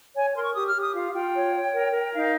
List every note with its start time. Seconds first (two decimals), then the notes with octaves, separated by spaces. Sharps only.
0.14 C#5 G#5
0.34 A#4 C6
0.43 C#6
0.53 G4 D#6
0.67 F6
0.74 G4
0.80 D#6
0.93 F4 F5
1.13 F4 G5
1.34 C#5
1.54 C#5
1.72 A#4
1.93 A#4
2.13 D#4 F5